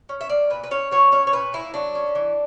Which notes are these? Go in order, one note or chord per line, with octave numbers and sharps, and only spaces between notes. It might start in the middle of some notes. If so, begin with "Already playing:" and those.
C#4
E5
A#3 D5
A#2 B4
B4
C#4 C#5
F#3 C#5
C#4 C#5
C#5
A#2 B4
A#3 E4
F#3 D4
C#4
E3